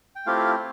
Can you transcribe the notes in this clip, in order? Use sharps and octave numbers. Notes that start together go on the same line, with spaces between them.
G5
A3 C4 E4 F4 G4 F5